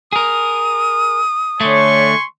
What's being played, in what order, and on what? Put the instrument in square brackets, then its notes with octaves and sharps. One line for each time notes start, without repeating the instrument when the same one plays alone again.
[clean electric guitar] G#4 A#4 [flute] D#6
[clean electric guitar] D3 A3 [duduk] C#5 [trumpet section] G#5 C6 C#6